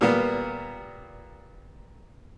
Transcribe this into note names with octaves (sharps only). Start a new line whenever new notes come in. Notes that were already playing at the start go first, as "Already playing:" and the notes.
A#2 G3 A#3 B3